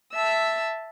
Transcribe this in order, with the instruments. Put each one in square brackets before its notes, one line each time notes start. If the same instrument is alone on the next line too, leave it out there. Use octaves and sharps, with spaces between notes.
[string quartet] E5 A5 E6